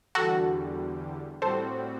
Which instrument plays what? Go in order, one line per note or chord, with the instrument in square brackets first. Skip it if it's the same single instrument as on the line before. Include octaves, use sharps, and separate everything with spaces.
[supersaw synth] E2 D3 G3 [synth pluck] F#4 A4
[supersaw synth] A2 G3 C4 F#4 [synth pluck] A4 C5